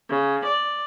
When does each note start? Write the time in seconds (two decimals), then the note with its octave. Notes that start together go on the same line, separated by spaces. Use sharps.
0.11 C#3
0.45 D5